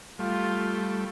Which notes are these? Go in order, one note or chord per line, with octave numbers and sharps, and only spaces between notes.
G3 A3 F4